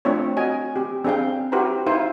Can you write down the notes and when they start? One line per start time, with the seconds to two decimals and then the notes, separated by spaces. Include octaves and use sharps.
0.05 A3 C4 D4 F4 C#5
0.37 F#4 D#5 G#5
0.76 C4 G4
1.05 C4 D4 G#4 F5 G5
1.52 E4 F#4 G4 B4 C5 A#5
1.86 D#4 E4 C5 F5